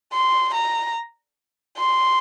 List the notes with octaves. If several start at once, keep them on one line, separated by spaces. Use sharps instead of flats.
C6
A#5
C6